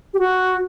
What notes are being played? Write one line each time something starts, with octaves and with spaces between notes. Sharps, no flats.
G4
F#4